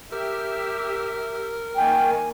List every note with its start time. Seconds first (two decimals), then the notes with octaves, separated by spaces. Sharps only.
0.12 G4 A#4 E5
1.77 D#3 A#3 G5 G#5